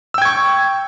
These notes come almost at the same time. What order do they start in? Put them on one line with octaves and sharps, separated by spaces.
E6 G5 G#6 C#6